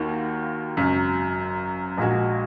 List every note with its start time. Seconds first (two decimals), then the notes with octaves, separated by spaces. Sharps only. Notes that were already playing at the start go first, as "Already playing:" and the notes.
Already playing: D#2 D#3 A#3 F#4
0.77 G#1 F#2 C#3 F#3
1.98 A#1 A#2 G#3 F#4